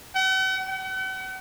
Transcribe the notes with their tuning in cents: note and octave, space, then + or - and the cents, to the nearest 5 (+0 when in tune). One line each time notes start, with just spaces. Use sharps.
F#5 +45
F#5 +40